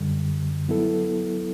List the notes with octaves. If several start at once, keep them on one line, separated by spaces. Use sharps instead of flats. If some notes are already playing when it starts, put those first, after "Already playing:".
Already playing: F#2 D3 G3
F#3 B3 E4 A4